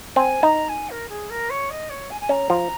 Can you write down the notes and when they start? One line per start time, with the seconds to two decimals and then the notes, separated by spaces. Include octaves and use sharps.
0.16 C4 G#5
0.43 D#4 A#5
0.69 G#5
0.90 A#4
1.09 G#4
1.30 A#4
1.50 C#5
1.70 D#5
1.90 C#5
2.10 G#5
2.21 G#5
2.29 C#4 A#5
2.50 F3